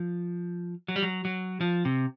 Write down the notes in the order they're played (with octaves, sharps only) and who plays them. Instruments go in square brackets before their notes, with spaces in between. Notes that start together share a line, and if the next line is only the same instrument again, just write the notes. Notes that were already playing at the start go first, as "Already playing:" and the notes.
Already playing: [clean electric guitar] F3
F#3
G3
F#3
F#3
F3
C3